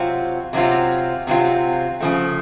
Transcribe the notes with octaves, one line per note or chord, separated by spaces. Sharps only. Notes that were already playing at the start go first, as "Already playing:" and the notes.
Already playing: C3 F#3 C4 F4
C3 F#3 C4 F4
C3 F#3 C4 F4
C#3 F3 A3